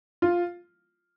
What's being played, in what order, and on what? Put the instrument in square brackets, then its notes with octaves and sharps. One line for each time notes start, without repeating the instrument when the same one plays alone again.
[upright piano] F4